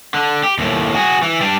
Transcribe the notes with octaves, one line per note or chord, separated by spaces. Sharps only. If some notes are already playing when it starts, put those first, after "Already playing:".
D3
G4
D#2 A2
F#4 G#4
E3
G3 D4